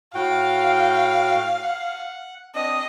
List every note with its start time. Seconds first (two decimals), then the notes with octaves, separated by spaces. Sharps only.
0.15 A2 F#4 F5 G5
1.63 F#5
2.55 C4 D4 D#5